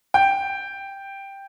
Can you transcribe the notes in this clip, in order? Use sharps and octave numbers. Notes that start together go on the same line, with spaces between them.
G5